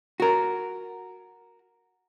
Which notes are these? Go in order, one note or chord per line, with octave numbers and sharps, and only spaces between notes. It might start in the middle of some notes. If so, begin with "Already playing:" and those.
F#4 A#4